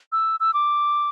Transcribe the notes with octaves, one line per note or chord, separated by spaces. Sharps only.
E6
E6
D6